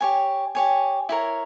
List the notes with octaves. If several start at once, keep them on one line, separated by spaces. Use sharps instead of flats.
G4 C#5 G#5
G4 C#5 G#5
E4 G4 A#4 C#5